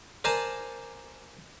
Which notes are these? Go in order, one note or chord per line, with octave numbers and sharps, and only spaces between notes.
A#4 C5 D5 G#5 A5